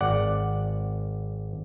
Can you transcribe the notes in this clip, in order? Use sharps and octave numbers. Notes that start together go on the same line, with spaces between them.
G#1 D5 F#5